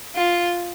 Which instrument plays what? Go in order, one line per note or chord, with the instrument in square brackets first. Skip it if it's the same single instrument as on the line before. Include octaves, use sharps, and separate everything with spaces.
[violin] F4